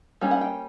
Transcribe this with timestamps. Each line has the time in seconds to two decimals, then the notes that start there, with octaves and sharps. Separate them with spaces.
0.21 G3 A#3 C#4
0.31 F#5
0.41 G5